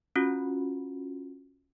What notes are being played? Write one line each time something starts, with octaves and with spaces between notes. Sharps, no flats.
C#4 F4 F#4